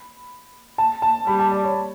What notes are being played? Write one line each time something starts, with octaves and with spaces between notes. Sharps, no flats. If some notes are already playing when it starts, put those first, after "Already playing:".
Already playing: B5
A5
A5
G3 B5
A5
D5
C#5